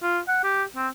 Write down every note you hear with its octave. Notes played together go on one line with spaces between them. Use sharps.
F4
F#5
G4
C4